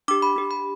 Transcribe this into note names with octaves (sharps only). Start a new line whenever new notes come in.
D4 G4 D6
B5
D4 G4
B5